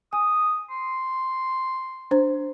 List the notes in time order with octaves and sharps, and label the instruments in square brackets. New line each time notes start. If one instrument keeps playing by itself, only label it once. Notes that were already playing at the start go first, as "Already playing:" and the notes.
[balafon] G#5 [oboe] D#6
[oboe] C6
[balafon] D4 C5